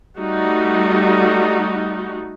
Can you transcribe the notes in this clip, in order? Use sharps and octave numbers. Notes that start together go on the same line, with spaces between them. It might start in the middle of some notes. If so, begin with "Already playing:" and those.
G3 A3 D#4 F#4